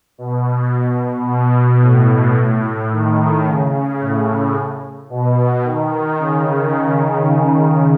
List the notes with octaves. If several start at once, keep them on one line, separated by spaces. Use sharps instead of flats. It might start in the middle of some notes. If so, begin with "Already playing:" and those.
B2
B2
A2
A2
D#3
C#3
A2
B2
D#3
C#3